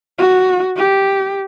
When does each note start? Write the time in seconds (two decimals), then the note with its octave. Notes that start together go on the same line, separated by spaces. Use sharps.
0.19 F#4
0.76 G4